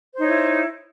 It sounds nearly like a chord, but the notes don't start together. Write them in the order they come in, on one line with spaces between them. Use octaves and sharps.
C5 D#4 C#5 E4